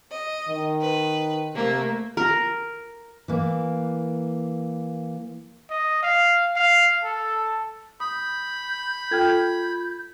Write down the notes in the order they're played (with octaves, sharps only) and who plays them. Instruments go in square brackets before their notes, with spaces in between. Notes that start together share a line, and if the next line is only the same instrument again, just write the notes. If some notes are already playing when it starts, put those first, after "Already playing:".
[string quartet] D#5
[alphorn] D#3
[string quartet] B4
[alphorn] C3 [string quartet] A3 A#3
[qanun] A#4
[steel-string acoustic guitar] E3 A#3
[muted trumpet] D#5
F5
F5
A4
[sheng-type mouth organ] B5 [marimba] D#6 [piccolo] G6
[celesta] F4 G#6 [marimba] A4 G5 F6